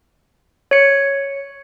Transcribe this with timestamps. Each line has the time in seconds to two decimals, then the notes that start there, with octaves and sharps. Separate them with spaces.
0.71 C#5 C#7